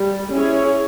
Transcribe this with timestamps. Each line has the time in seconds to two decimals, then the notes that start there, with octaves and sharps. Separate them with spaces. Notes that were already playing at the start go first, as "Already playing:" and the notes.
Already playing: G3
0.34 C#4 E4 G#4 C#5